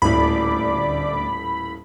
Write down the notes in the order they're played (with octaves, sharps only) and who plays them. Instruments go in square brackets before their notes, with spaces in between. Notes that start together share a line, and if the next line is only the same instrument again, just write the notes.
[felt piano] D#1 A2 [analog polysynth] D2 D5 D6 [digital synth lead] B5